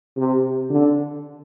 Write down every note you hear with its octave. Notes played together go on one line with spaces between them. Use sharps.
C3
D3